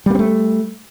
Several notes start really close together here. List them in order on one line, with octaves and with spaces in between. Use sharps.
G3 A#3 C4 A3